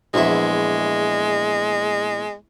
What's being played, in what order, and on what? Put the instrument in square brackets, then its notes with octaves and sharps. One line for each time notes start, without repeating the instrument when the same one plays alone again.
[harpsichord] A#1 E2 E5 [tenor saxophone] G#3